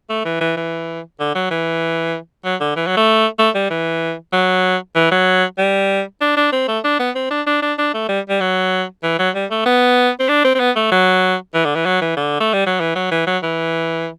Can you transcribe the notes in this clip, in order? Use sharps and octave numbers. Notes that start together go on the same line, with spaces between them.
A3
E3
E3
E3
D3
F#3
E3
F#3
D3
E3
F#3
A3
A3
G3
E3
F#3
E3
F#3
G3
D4
D4
C4
A3
D4
B3
C4
D4
D4
D4
D4
A3
G3
G3
F#3
E3
F#3
G3
A3
B3
C4
D4
C4
C4
B3
A3
F#3
E3
D3
E3
F#3
E3
D3
A3
G3
F#3
E3
F#3
E3
F#3
E3